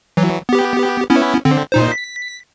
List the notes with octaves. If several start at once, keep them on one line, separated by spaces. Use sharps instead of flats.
E3 F#3
B3 G4
B3 C#4 E4
D3 C4
A#2 D#4 C5
B6